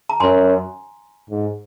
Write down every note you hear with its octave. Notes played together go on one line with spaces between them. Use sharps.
A#5
F#2 G#5 C6
G#2